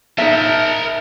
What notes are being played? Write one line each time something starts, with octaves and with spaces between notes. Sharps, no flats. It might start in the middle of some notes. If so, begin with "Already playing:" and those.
D#4 A#4 E5 A5